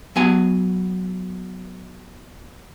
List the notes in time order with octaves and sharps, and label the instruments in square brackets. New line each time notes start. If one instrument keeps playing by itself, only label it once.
[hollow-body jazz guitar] F#3 B3 G#5